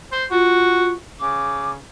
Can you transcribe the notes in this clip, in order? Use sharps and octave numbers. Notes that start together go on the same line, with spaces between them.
C5
F4 F#4
C#3 D6